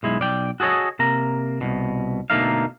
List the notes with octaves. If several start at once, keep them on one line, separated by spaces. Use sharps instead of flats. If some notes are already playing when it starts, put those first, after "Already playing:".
B1 G#3 E4
B1 D5 G5
F#4 G#4 A4 C#5 D#5
C3 A#3 A#5
C2 B2
B2 D3 A3 A#3 D#4 F5